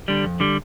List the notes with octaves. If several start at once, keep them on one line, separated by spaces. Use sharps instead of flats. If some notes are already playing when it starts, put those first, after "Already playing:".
D3 G3
F2
D3 G3